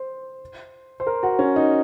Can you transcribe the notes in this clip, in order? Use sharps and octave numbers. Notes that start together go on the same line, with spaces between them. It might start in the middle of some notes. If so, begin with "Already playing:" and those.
Already playing: C5
C5
A#4
F#4
C#4
D#4